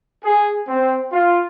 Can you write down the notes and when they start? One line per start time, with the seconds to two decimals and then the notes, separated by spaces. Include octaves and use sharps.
0.24 G#4
0.68 C4
1.13 F4